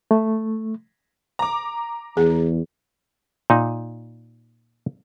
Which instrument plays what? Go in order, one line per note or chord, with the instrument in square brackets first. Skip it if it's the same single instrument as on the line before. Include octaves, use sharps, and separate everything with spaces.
[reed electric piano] A3
[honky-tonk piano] A#5 D6
[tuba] E2 [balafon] G#4
[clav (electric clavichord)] A#2 D#4